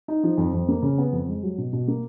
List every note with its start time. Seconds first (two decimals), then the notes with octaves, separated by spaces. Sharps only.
0.08 D#4
0.23 F3
0.38 F2
0.53 F2
0.68 A#3
0.82 C#3
0.98 B3
1.12 F2
1.28 G#3
1.43 F#3
1.58 B2
1.73 B2
1.88 A#3